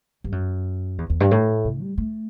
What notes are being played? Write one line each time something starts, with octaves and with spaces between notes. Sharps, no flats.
G2
F#2
E2
E2
G2
A2
C3
G3
A3